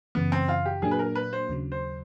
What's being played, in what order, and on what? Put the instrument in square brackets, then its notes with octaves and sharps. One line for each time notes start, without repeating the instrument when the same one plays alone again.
[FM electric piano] F#2 C#3 E3 [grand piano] B3
[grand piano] C4
F4
G4
[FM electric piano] A#2 F#3 A#3 D4 [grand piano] G#4
[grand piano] B4
A#4
B4
C5
[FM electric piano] D#2 C#3 F#3
[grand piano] C5